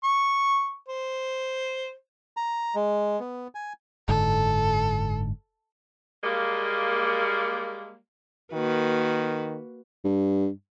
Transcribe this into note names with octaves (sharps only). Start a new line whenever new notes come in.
C#6
C5
A#5
G#3
B3
G#5
F#1 G#2 D3 A4
G3 G#3 A#3
D#3 A#3 F#4 B4
G2